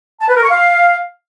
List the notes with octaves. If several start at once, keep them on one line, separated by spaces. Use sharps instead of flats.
A5
B4
A#4
C#6
F5